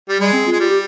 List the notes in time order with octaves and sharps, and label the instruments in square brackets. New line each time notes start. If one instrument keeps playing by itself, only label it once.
[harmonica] G3
[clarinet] G3 [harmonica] G#3
[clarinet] C4
F4
[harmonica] G#3
[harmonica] G3 [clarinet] F4
[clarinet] G4